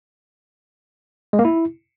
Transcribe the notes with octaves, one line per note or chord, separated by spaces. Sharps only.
G#3
A#3
E4